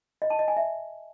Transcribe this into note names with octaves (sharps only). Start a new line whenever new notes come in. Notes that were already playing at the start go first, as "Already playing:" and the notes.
D#5
A5
D#5
G#5
E5